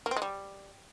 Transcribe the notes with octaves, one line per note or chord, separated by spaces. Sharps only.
A#3
C4
G#3
G3